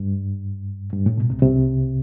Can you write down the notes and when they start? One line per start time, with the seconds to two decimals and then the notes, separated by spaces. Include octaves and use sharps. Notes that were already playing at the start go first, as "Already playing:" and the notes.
Already playing: G2
0.93 G2
1.06 A2
1.18 B2
1.30 C2 C3
1.42 C2 C3